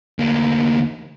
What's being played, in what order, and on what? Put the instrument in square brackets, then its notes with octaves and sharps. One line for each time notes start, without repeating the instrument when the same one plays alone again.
[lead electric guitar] D2 A#3